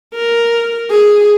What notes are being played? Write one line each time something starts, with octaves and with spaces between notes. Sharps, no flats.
A#4
G#4